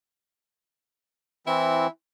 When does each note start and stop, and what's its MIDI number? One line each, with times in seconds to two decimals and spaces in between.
1.47 1.87 52
1.47 1.87 60
1.47 1.87 64